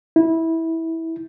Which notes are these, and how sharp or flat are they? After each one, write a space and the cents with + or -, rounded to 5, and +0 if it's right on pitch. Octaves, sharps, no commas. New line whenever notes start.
E4 -15